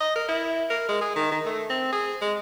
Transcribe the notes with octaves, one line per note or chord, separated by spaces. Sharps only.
D#5
A#4
E4
A#4
G#3
G#4
D#3
D#3
A3
C4
G#4
G#3